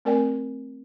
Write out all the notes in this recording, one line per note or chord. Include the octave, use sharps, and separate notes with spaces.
A3 C4 A#4 D5 G5 G#5